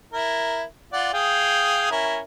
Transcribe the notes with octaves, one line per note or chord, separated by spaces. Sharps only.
E4 A#4
F4 D5 F#5
G#4 F5 G5
C#4 E4 A#4